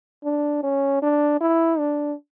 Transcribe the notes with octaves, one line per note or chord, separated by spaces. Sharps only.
D4
C#4
D4
E4
D4